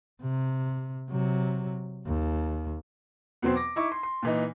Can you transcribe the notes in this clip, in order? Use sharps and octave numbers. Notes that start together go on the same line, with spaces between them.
C3
C3 F#3
D#2
E2 B2 F#3 B3 C4 C6
D6 A#6
D#4 E4 C#6 D6
C6
C6
A#2 E3 D#4